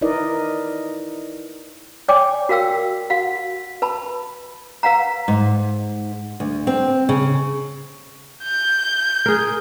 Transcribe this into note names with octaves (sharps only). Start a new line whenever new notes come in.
D#4 E4 A#4 B4 D5 D#5
C#5 D5 G5 G#5 D6
F#4 A#4 F5 G5 E6
F#4 F5 F#5
B4 A5 B5
B4 F5 F#5 A#5
G#2
D2
C4
C#3
G6
G#4 A#4